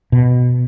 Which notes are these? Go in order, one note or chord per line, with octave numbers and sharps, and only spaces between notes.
B2